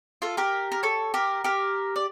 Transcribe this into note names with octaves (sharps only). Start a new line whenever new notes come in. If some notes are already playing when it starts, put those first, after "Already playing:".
F4 A4
G4 A#4
A#4
A4 C#5
G4 A#4
G4 A#4
D5